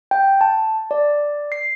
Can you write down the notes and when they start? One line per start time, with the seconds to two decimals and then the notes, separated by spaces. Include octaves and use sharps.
0.11 G5
0.41 A5
0.91 D5
1.52 C7